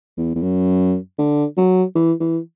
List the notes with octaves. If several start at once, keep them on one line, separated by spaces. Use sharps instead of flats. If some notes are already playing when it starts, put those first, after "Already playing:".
E2
E2
F#2
D3
F#3
E3
E3